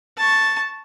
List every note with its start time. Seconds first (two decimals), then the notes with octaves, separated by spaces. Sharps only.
0.17 A5 C#6